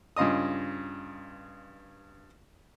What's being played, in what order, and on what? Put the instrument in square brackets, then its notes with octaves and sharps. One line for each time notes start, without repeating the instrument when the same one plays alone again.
[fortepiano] G2 C#3 F4 D#5 D#6